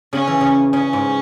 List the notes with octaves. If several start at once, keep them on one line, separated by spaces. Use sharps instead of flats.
C#3 C#4
E3
C#3
C#3 C#4
G#2